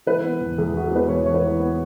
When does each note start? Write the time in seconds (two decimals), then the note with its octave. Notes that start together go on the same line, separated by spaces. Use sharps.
0.06 E3 B4
0.23 B3
0.41 E2
0.58 E2 G#4
0.74 E3 F#4
0.83 G#4
0.92 B3 B4
1.08 E2 C#5
1.25 E2 C#5
1.34 B4
1.42 E3
1.60 B3